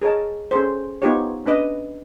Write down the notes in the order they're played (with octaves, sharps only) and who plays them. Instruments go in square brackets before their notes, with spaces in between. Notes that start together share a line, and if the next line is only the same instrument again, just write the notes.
[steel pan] G#4 A#4 C#5 D#5 A5
C#4 G#4 A4 C5
B3 D#4 F4 G4 C5 C#5
C#4 D4 B4 D#5